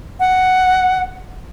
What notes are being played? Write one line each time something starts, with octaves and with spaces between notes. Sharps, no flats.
F#5